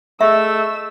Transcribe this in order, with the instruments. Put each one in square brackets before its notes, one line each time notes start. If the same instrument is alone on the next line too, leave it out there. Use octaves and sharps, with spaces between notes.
[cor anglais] A3 [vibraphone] G#4 D#5 [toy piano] E5 [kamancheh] E6